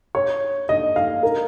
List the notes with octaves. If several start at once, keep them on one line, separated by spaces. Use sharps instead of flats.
C#5
D#5
F5
A#4